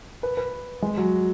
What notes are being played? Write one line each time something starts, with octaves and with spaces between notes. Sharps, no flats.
B4
B4
G#3
F#3